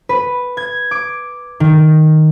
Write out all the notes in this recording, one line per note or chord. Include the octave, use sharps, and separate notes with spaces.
B4
G#6
D6
D#3